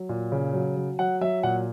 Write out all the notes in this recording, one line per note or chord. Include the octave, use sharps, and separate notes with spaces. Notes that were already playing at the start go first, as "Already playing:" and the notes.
Already playing: F#3
A#2
C#3
F#3
F#3
F#3 F#5
F#3 E5
A#2 F#5